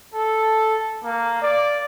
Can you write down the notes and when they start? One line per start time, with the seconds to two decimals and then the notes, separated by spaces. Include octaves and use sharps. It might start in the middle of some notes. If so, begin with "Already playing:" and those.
0.14 A4
1.04 A#3
1.42 D5